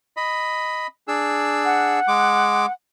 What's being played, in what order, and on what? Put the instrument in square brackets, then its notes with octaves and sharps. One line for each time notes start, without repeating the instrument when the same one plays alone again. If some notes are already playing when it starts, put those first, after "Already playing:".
[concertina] D#5 B5
D4 G#4 E6
[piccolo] F#5
[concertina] G#3 D6